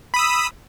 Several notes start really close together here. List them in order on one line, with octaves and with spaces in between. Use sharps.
B5 D#6 E6